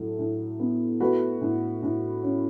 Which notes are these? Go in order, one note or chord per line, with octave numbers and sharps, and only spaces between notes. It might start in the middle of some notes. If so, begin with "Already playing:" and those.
Already playing: A2 F#3 A4
A2
B3
A3 F#4 B4
A2
A2
C#4